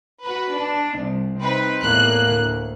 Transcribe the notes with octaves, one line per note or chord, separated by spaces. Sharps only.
F#4 B4
D4
C2
C4 D#4 B4
E2 A2 A#3 F#6
D2